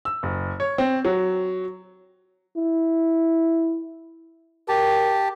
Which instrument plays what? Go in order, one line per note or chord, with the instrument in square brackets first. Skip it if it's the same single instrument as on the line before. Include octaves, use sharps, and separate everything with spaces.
[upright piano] E6
F#1
C#5
C4
F#3
[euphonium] E4
[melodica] G4 A5 [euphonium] A#4